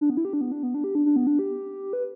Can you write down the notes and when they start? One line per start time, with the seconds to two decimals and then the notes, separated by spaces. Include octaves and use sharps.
0.01 D4
0.10 B3
0.17 E4
0.25 G4
0.33 D4
0.41 B3
0.52 D4
0.63 B3
0.74 D4
0.84 G4
0.95 D4
1.06 D4
1.16 B3
1.27 D4
1.39 G4
1.93 B4